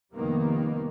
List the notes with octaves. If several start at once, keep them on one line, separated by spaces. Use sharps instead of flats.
F1 D#3 G3 A#3 B3